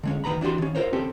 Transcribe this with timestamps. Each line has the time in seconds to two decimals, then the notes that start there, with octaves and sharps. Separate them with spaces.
0.03 D3 G#3 C#4
0.24 D2 D#3 B3 A#5 B5
0.41 E3 D4 F#4 G4 C6
0.58 D#3 C#4
0.75 F4 F#4 A#4 C5 C#5
0.93 C4 C#4 G4 A4